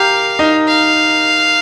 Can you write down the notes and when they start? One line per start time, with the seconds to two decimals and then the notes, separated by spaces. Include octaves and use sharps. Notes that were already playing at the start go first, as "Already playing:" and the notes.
Already playing: G4 A#4 F5
0.39 D#4
0.68 F5